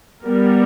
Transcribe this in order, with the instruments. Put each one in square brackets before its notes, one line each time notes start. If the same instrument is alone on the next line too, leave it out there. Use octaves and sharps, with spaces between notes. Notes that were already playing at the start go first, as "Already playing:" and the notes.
[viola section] G3 B3 A#4